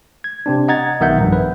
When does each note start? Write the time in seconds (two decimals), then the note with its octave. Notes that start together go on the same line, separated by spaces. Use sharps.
0.24 G#6
0.46 C3 C4 D4
0.68 D#5 F#5 A#5 G#6 A6
1.00 B1 D#3 B3 E5 F#5 G6
1.18 A#1 G2
1.33 B4